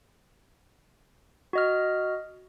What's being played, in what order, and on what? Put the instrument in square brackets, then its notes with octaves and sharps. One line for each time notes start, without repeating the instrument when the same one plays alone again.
[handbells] F#4 D#5 F6